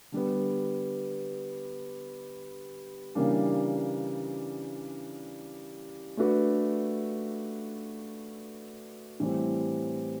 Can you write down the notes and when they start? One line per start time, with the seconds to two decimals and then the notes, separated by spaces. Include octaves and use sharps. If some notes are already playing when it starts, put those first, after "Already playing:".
0.12 D3 G3 B3
3.15 C#3 E3 G3 A#3 D4
6.17 A3 D4 F#4 B4
9.20 A2 E3 G3 C4